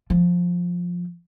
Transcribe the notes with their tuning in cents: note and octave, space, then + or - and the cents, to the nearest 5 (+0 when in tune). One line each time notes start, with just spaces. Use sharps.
F3 +10